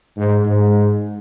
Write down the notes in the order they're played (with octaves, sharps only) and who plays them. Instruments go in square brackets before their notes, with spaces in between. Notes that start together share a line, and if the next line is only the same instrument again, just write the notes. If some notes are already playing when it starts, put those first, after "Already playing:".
[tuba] G#2
G#2